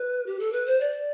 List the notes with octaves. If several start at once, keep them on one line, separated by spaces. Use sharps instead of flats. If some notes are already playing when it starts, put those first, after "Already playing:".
Already playing: B4
G4
A4
B4
C5
D5